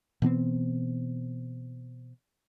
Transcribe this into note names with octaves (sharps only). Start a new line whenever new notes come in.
B2 E3 B3 C4